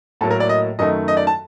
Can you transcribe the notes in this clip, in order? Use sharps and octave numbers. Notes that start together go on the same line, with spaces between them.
A2 F#3 A#3 A4
A#4
D5
D#5
F#2 D#3 A3 D#5
D#5
D5
A5